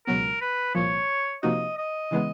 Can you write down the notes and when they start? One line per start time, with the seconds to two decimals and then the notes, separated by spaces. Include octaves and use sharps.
0.07 C#2 B2 F#3 B3 A#4
0.41 B4
0.75 C2 A#2 F3 C#5
1.43 C3 F3 A#3 D#4 F#4 D#5
1.78 D#5
2.11 C#3 E3 G#3 B3